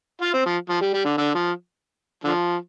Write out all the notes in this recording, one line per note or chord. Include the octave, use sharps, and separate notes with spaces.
F4
C4
F3
F3
G3
G3
D3
D3
F3
D3 F3